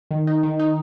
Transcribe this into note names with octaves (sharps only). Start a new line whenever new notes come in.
D#3
D#4
D#3
D#4